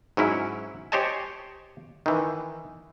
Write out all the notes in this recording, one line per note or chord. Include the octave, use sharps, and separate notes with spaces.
G#2 F#3 C#4 E4
G4 C5 C#5 D#5 G#5 A5
D#3 E3